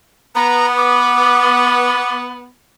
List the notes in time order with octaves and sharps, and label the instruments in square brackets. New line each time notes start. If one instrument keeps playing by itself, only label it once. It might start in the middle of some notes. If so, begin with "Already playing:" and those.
[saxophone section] B3 [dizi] A#5
[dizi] D6